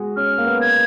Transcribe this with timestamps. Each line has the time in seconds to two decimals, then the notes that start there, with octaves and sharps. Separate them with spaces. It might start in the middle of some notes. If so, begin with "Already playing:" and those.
Already playing: G#3 F#4 G#4
0.16 C#4 F6
0.38 A#3
0.46 B3
0.61 G#6